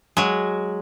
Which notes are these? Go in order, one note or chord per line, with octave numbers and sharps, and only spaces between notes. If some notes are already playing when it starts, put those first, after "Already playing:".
F#3 G#3